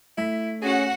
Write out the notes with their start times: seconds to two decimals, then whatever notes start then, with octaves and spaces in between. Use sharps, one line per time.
0.18 A3 E4 B6
0.62 C#4 F#4 G#4 F#5